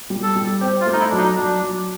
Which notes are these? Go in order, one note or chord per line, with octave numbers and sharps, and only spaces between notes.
G3
A4
G3
C4 G4
F4
A3
D#4
E4
F#3 D4
D#4
F#3 D4
F#3